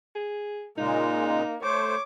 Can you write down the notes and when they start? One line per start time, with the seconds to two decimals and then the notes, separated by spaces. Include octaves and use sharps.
0.15 G#4
0.78 A#2 C#3 G#3 A#3 D#4
1.63 A3 C5 C#5 D6